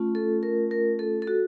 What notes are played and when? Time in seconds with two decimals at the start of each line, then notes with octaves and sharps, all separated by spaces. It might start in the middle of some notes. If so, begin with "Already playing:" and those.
Already playing: A3 C#4 F4
0.15 A4
0.43 A#4
0.71 A#4
0.99 A4
1.22 A4
1.27 F#4